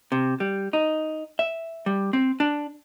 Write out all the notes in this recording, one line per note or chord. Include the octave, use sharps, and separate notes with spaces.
C3
G3
D#4
E5
G3
C4
D4